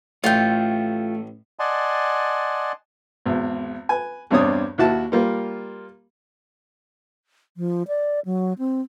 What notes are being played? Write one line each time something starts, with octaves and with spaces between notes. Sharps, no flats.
A1 A3 F4 G5
D5 D#5 F#5 G#5 A5 C6
G#1 E2
B4 G#5
E2 G2 C4 D4 C#5 D#6
D#2 E4 F#4 A5
G3 A#3 F4
F3
D5
F#3
C4